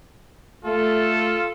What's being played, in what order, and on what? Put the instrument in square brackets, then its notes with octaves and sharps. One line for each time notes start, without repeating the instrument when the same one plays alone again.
[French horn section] A3 [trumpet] F4 [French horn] A4